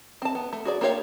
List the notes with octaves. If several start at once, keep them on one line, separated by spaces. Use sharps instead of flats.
C4 A5
B3
A3
F#4 G#4 D5
A#3 D4 G4 C#5 F5